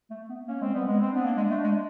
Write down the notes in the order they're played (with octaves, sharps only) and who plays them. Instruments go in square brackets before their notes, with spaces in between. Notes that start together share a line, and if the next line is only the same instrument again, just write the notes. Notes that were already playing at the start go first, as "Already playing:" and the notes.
[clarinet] A3
B3
[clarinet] A#3 [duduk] C#4
[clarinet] G#3 [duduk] C4
[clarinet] G3 [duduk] B3
[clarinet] G#3 [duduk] B3
[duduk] C4
[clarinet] B3 [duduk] D4
[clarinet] A#3
G#3
A3
G#3